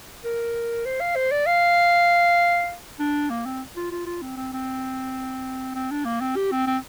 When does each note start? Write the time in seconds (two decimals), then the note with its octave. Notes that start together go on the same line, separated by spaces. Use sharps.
0.24 A#4
0.85 C5
1.01 F5
1.16 C5
1.31 D5
1.46 F5
2.99 D4
3.30 A#3
3.46 C4
3.76 F4
3.92 F4
4.06 F4
4.22 C4
4.37 C4
4.52 C4
5.75 C4
5.91 D4
6.05 A#3
6.21 C4
6.36 G4
6.51 C4
6.67 C4